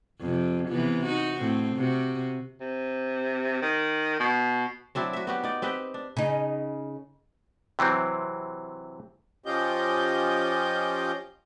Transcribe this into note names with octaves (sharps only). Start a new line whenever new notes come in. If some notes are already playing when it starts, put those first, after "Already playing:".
F2 C3
C3 E3 B3
D#4 F#4
A2 C4
C3 F#4
C3
D#3
B2
F#3 C4 D4 E4
F#4 E5
B3 F#4 G4
D#4 D5
C4 G4 B4 D#5
D4
C#3 D#4
C3 E3 F#3 C4
F3 C#4 F4 G4 D#5 G6